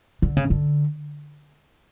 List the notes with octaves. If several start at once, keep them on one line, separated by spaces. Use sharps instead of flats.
D3
C#3
D3